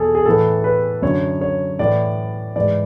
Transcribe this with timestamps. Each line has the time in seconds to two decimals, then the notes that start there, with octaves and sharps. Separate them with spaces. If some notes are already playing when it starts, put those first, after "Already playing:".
Already playing: E2 B2 G#4 A4
0.15 G#4
0.26 A2 E3 A4
0.64 B4
1.02 F#2 D3 C#5
1.41 C#5
1.79 A2 E3 D5
2.56 G#2 E3 D5